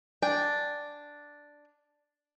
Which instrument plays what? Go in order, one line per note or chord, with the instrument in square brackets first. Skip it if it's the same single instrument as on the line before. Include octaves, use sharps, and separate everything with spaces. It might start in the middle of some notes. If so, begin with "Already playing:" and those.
[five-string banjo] D4 G5 G#5